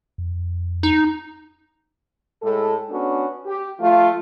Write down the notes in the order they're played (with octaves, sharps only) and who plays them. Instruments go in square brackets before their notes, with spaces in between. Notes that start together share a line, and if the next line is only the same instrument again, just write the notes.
[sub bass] F2
[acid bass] D#4
[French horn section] A2 G#3 A4
B3 C#4 D4 F#4
G4
F3 A3 F4